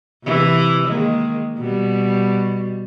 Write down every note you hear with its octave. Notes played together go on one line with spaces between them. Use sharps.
C3 E3
D#3 G#3 A#3
B2 G3